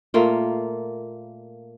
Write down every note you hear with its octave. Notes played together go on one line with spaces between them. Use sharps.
A#2 A3 A#3 F4